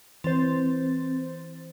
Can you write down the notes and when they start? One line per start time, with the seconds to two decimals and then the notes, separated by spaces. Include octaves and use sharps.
0.24 E3 C4 C5 A6